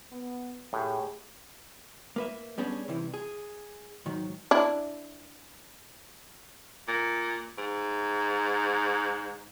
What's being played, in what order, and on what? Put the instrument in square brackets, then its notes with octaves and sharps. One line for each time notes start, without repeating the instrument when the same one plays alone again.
[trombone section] B3
[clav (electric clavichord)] A2 [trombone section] A3 G4 G#4
[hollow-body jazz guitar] A#3 B4 E5
G3 B3 C#4 D4 G#4
C2 C3 E3
G#4
G#2 D#3 F#3
[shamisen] D4 E4
[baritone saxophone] A#2
G#2